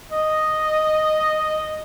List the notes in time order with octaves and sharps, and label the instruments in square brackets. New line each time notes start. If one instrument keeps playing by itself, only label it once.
[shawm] D#5